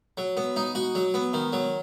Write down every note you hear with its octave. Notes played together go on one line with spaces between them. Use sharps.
F#3
B3
D#4
F#4
F#3
B3
D#3
F#3